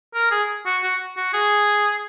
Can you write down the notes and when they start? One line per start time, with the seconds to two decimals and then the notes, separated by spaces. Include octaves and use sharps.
0.14 A#4
0.31 G#4
0.66 F#4
0.83 F#4
1.17 F#4
1.33 G#4